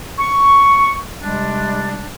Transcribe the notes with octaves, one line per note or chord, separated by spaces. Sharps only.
C#6
C3 G3 G#3 D4